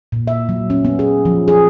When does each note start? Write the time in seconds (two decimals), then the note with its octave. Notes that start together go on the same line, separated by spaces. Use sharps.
0.12 A#2
0.27 E5
0.49 F#3
0.70 C#4
0.85 B3
0.99 G#4
1.25 F3
1.48 G#4